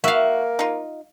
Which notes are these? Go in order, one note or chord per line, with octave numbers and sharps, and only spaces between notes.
A#3 F#4 E5 F5
D#4 F4